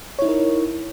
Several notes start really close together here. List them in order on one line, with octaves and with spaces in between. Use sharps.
C#5 E4 D#4 A#4